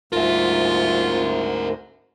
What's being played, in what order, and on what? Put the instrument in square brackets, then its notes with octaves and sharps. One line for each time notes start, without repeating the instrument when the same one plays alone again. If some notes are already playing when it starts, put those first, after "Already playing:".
[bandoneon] D2 G#2 [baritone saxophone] F4 [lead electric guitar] A#4 E5